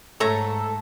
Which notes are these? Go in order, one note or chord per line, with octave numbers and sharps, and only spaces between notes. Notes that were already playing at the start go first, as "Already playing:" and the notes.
G#2 A3 A4 C#5 E5 A#5